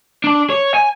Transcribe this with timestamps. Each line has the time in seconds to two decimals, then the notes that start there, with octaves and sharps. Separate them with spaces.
0.24 D4 D5
0.50 C#5
0.74 G#5